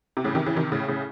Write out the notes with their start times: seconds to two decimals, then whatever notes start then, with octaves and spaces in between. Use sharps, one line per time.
0.17 C3
0.24 A2 C#3
0.35 C3 D#3
0.46 C#3 E3
0.56 C3 D#3
0.72 A2 C#3
0.88 A2 C#3